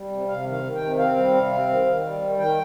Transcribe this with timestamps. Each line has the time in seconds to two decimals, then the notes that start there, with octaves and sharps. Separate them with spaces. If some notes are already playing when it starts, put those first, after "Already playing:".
Already playing: G3
0.11 C3
0.28 C3 F5
0.46 D#3
0.52 F5
0.63 D#3
0.75 G5
0.81 C3
0.99 C4 F5
1.16 G3
1.34 C3
1.52 C4
1.68 D#3
1.86 D#3
2.03 G3
2.22 D#3
2.39 D#3 G5